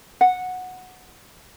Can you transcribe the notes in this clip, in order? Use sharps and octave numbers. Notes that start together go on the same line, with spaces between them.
F#5